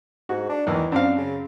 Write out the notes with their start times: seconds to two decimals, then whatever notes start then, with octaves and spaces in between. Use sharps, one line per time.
0.29 G#2 F#4
0.49 D4
0.67 E2 D#3 E3
0.92 F#2 C4 D4 F5
1.17 C#3